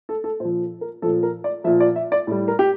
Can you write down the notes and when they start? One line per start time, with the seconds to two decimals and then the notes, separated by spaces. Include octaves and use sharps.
0.09 A4
0.24 A4
0.40 A#2 C5
0.45 F3
0.81 A#4
1.02 F3 A4
1.06 A#2
1.23 A#4
1.44 D5
1.64 A#2 F3 E5
1.80 D5
1.96 E5
2.12 D5
2.27 A2 G3
2.48 A#4
2.59 G4